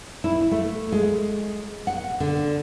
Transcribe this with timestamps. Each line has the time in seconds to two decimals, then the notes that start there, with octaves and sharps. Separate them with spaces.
0.24 E4
0.51 A3
0.92 G#3
1.87 F#5
2.20 D3